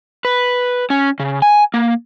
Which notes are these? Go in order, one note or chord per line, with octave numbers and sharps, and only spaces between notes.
B4
C#4
C#3
G#5
A#3